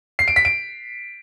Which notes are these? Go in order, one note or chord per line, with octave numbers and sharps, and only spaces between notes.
C7
D7
B6
D7